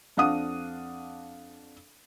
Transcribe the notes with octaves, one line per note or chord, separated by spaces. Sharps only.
F2 D4 F5 F#5 D#6